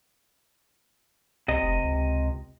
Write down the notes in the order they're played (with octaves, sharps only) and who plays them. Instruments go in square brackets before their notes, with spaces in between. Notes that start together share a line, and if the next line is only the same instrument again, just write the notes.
[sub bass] C2 [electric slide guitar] C3 D#5
[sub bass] F1
C#2